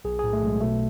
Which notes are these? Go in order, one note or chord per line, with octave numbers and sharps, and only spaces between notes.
B1 G#4
A2 G#4
A3
B1 G#3
B2 A3